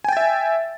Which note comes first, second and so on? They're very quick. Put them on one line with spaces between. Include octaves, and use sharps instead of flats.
G#5 G5 A6 E5